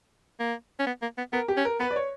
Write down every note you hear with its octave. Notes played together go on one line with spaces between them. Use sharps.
A#3
C#4
B3
A#3
B3
B3 A#4
G4
C#4
A#4
B3 B4
D5
C#5